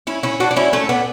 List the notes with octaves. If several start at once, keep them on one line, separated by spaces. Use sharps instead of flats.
C#4 E4
C#4 E4
D4 F#4
D4
C#4 E4
A3 C#4
B3 D4